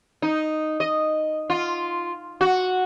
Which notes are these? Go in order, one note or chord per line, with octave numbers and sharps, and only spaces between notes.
D#4
D#5
F4
F#4